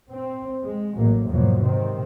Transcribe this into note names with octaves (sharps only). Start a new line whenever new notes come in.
C4
G#3
A1 F#3 A#3
E2 G#2 B2 F3 F#3 A#3
C3 D#3 C4